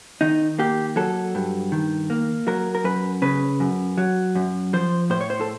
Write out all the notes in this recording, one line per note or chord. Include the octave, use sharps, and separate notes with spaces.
D#3 D#4
A#3 G4
F#3 A4
G2
D#3
A#3
F#3 A#4
A#4
F#2 B4
C#3 B4
F#2
F#3
F#2
F3 C5
A2 C5
C#5
C5
A4